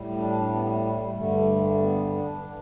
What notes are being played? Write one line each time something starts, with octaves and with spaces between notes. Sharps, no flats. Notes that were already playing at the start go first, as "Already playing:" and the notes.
Already playing: A2 G3
D4
B3
A3
A3
G3
G2 D3 G3 A3
B3
D4
E3